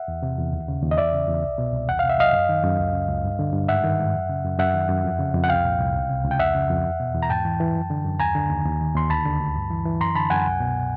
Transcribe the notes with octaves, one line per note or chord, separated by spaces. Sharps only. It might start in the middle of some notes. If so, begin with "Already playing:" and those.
Already playing: E5 F#5
E2
C3
E2
D#2
C#3
D#2
D#5
E2 D5 E5
C#3
E2
C2
B2
C2
E2 F#5
C3 F5
E5
F#3 D#5 F5
F#2
D#3
F#2
C#2
C#3
C#2
G2
D3
G2
G#2 E5 F#5
D#3
G#2
F#2
C#3
F#2
F#2 E5 F#5
D#3
F#2
F2
C#3
F2
F#5
C2 F5 G5
A#2
C2
C#2
C3
C#2
G5
F2 E5 F#5
C#3
F2
E2
B2
E2
A#5
G#2 G5 A5
E3
E3
F#2
D3
F#2
D#2 G#5 A#5
D3
D#2
D#2
D#3
D#2 C6
D2 A5 B5
D3
D2
G2
E3
E3
F#2 A#5 C6
D3 A5 B5
F#2 F#5 G#5
C2
B2